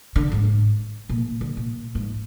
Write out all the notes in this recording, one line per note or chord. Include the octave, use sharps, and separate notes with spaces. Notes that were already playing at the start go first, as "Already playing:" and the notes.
D3
G#2
A#2
D3
A#2
G#2